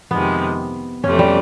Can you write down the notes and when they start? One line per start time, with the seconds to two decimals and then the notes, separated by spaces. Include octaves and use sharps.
0.11 F2 C3 D#3 G#3 B3
1.04 F2 C3 E3 A3 C#4
1.19 G3